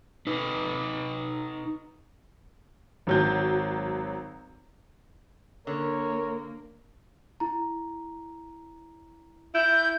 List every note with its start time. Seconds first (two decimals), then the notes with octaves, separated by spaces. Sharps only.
0.27 D#4 B4
3.07 G#1 F#3 G6
5.67 D3 A#3 A#4 C#5
7.40 E4 A#5
9.55 E4 G6